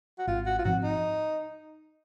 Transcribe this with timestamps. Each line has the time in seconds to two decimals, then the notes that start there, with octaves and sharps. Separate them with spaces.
0.19 F#4
0.27 G#1 F4
0.46 F#4
0.59 F4
0.65 G#2 F3 C4 F#4
0.84 D#4